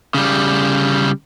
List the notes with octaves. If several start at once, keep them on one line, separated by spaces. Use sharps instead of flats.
C#3 G3